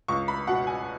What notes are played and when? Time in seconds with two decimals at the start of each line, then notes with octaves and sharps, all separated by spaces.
0.08 C#2 C#6
0.28 B5
0.47 B2 F#5
0.67 G#5